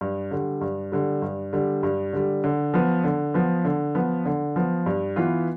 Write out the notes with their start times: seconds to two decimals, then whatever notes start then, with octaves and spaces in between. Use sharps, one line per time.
0.01 G2
0.31 D3 G3
0.61 G2
0.92 D3 G3
1.22 G2
1.53 D3 G3
1.83 G2
2.13 D3 G3
2.44 D3
2.74 F3 B3
3.04 D3
3.34 F3 B3
3.65 D3
3.95 F3 B3
4.26 D3
4.56 F3 B3
4.86 G2
5.16 E3 B3 F4